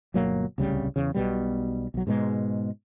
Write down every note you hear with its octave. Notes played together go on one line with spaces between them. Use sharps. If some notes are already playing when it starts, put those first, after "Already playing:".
G1 B2 F#3 A#3
D1 C2 C#3 G3
E2 C#3
B1 B2 G3
B1 F#3
G#2 B2 G#3